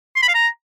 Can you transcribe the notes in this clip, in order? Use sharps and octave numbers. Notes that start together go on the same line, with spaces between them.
C6
B5
F5
A#5